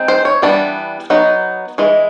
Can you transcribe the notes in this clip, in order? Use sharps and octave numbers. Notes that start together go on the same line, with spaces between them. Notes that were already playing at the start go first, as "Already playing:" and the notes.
Already playing: G#3 C4 D#4
C5
C#5
E3 G3 B3 D4
F#3 B3 D#4
E3 G#3